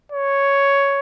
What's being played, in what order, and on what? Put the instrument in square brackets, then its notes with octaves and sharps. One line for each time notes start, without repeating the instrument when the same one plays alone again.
[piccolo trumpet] C#5